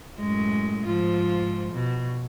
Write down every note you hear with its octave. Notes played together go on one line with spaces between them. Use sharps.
F#2 A2 G#3
G#2 F3 F4
B2